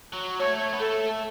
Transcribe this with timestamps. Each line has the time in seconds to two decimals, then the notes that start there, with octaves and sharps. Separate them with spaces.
0.13 F#3
0.39 A3 C#5
0.73 B3
0.80 A3 A4